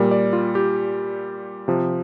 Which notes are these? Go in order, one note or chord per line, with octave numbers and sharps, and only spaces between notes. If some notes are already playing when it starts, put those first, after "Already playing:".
Already playing: A#2 G3 A#4
D5
F4
G4
C3 F3